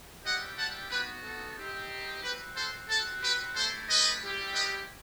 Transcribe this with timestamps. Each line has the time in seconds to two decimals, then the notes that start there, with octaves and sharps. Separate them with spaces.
0.24 G3 C4 E4 G4 D#5 F#5
0.57 F#5 A5
0.90 B3 D#4 F#4 G4 B4
1.24 A4
1.57 C4 D#4 G4
2.22 C4 F#4 G4 B4
2.56 A4 C5
2.89 C4 F#4 A4
3.23 G4 B4
3.56 A3 E4 G4 A4 C5
3.88 B4 D#5
4.22 G3 C4 E4 G4
4.55 B4 D#5